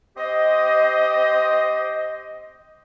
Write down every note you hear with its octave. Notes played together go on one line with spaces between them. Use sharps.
C4 G4 C5 D#5